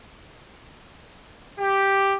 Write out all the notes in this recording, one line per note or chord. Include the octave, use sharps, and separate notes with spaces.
G4